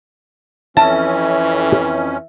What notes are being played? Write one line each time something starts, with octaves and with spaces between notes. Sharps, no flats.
F2 E3 C#4 E5 A5